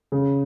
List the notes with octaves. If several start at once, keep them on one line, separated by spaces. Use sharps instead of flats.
C#3